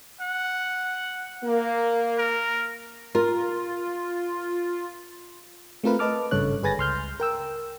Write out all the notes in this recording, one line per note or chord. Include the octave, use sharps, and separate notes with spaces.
F#5
A#3
A#4
F4 A#4
A3 C4 F4 A#4 B4
B4 D#5 A5 D6 F6
G#1 G2 C#3 A4 C#5 F#6
G1 G#4 B4 G#5 A6 A#6
C#2 C6 F6 G6
A#4 G5 E6